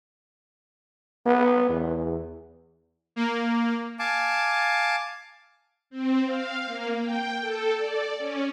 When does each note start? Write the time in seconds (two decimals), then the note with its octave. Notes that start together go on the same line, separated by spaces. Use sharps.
1.26 B3
1.69 E2
3.16 A#3
3.99 F5 G#5 A5 D6
5.90 C4
6.26 F5
6.66 A#3
7.02 G5
7.41 A4
7.77 D5
8.18 C#4